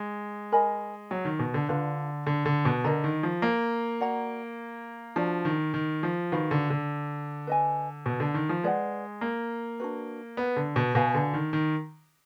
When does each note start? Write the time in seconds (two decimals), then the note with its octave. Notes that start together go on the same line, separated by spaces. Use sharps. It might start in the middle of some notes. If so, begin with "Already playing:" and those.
Already playing: G#3
0.52 A#4 D#5 G#5 B5
1.11 F#3
1.25 D#3
1.39 B2
1.54 D3
1.69 D3 D4 F4 B4
2.27 D3
2.46 D3
2.65 B2
2.84 D3 A#4 D#5 A#5
3.04 D#3
3.23 F3
3.42 A#3
4.00 F#4 D5 F#5 A#5
5.16 F3 D4 F#4 D5
5.45 D#3
5.74 D#3
6.03 F3
6.32 D#3 F#4 B4 F5 B5
6.51 D3
6.70 D3
7.47 B4 D#5 G#5
8.06 B2
8.20 D3
8.34 D#3
8.49 F3
8.63 G#3 B4 D5 F#5
9.21 A#3
9.80 D4 F#4 B4
10.37 B3
10.56 D3
10.76 B2
10.95 B2 F#4 B4 F5 G#5
11.15 D3
11.34 D#3
11.53 D#3